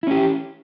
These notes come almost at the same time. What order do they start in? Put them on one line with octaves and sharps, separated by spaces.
E4 C#4 G4